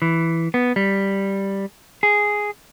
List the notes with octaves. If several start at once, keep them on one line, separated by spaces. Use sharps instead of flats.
E3
B3
G3
G#4